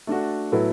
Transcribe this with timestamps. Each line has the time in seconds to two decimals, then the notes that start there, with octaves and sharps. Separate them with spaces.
0.07 A3 D4 F#4
0.52 A2 F#3 B3 E4 A4